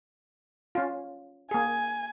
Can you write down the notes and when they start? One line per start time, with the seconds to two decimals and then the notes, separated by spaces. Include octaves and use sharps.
0.75 C#4 F4
1.51 A#3 G#4 G#5